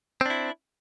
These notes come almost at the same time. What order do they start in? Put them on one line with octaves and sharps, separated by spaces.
C4 D4 E4